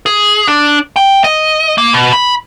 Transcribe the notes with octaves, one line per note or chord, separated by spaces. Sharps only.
G#4
D4
G5
D#5
A#3
B2
B5